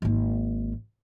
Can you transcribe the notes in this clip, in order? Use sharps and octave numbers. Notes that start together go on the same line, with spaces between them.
G#1 A#3